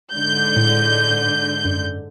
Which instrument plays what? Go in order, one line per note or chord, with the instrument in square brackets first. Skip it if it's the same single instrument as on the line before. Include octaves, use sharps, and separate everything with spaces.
[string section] G#2 D3 G6
[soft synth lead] A2
F#2